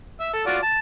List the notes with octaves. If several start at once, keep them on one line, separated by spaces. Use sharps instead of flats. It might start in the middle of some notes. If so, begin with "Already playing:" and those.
E5
A4
F4 F#4 D5
A5